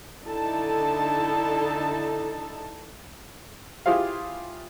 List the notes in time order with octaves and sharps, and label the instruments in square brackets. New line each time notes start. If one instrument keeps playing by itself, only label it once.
[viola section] D3 D#4 E4 A4 A5
[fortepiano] E4 F4 G4 G#4 C5 F5